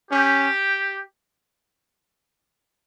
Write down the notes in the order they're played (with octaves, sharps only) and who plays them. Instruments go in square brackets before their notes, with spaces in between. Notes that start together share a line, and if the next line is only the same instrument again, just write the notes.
[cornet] C#4 [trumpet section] G4